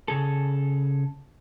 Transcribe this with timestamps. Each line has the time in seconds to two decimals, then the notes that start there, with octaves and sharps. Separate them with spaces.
0.08 C#3 G#4 A4